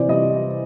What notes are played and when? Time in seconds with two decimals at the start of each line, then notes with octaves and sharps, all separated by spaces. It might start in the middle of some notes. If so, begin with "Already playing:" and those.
Already playing: C3 E3 C5 D5
0.09 G3 D#5